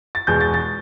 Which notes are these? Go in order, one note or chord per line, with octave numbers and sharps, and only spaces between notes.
A6
E2 B2 G#3 G6
A6
A6